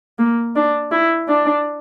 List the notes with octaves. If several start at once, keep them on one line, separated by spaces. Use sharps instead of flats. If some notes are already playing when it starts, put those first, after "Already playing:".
A#3
D4
E4
D4